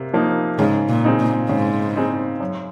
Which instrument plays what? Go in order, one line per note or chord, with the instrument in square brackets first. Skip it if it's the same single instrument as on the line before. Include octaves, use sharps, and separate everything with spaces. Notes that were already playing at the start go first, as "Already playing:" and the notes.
Already playing: [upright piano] C3 A#3
F3 A#3 D#4
[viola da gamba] G#2 [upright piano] C#3
[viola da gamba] A#2
[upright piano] G#3 C4 D#4
[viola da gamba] A#2
[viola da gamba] G#2 [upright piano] C#3
[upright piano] G#3 C4 D#4
F#2